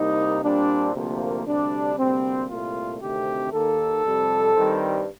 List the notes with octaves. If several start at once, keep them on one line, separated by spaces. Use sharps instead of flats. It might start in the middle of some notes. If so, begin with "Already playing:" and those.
Already playing: C2 C3 G3 A#3 D#4
A#2 G3 C4 D4
D2 C3 F3 A#3
D2 C3 G3 D4
D2 C3 G3 A#3 C4
C2 A#2 A3 F4
D2 C3 D#3 A3 C4 G4
D#2 D#3 A#3 A4
F2 C3 G3
G2 D#3 G3 C4